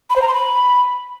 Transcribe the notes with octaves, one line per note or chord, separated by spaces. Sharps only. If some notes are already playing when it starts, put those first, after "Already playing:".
B5
C5
A#5
C6
B5